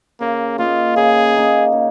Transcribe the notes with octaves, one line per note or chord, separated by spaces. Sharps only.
C#3 A#3
A#3 D#4 F4
C#3 G#4
A#3 D#4
C#3